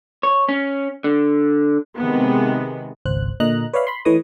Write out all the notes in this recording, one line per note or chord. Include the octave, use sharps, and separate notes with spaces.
C#5
C#4
D3
C3 D#3 G#3 B3
G#1 C#2 C5 F#6
A#2 D3 D#5 A#5 F#6
B4 C#5 D5 E5 F5 B5
B5 C6
E3 A3 B4 C#5 D#5 D#6